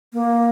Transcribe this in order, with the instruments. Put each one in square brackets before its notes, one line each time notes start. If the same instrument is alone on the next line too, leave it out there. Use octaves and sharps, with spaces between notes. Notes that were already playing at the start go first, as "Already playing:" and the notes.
[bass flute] A#3